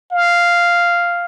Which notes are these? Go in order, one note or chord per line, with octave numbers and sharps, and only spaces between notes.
F5